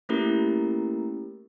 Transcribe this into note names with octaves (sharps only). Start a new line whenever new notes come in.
A3 A#3 C#4 E4 G4 A#4